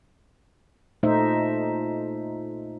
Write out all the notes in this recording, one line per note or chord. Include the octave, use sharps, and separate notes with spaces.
A#2 A3 D#4 C5 E5